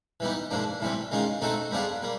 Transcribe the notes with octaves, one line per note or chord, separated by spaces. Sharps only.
E3 G3 B3 D#4
G#2 F3 A#3 D4
A2 E3 G3 C4
D#3 G#3 C#4 F4
A3 C4 D#4 F#4 A4
G3 B3 D4 F4 G#4
G3 A#3